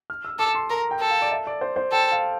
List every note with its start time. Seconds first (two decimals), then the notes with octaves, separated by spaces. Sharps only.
0.10 F6
0.25 E6
0.39 A4 D6
0.55 C6
0.70 A#4 A#5
0.91 G5
1.01 A4
1.10 F5
1.22 D5
1.31 E5
1.47 D5
1.61 C5
1.76 C5
1.92 A4 G5
2.12 F5